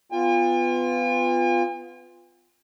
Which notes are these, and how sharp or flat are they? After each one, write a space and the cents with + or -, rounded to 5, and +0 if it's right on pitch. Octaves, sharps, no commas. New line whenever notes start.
B3 +20 F4 +0 G#5 -45